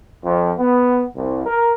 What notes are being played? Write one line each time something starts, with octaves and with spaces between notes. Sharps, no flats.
F2
B3
C2
A#4